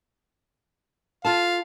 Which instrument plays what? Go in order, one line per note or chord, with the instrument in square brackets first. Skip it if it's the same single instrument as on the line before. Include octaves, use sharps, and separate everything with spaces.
[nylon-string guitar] F4 A4 A5 [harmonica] F5